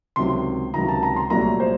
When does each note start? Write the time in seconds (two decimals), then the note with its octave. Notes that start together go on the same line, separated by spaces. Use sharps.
0.16 C#2 C3 D#3 F#3 C6
0.74 C#2 C3 D#3 F#3 A#5
0.88 A5
1.03 A#5
1.16 C6
1.30 C2 A#2 F#3 A3 A#5
1.60 C5